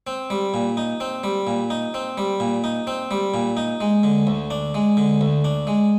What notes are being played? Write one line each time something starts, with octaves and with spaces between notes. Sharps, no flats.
C4
G3
A#2
D#4
C4
G3
A#2
D#4
C4
G3
A#2
D#4
C4
G3
A#2
D#4
G#3
D3
D2
D4
G#3
D3
D2
D4
G#3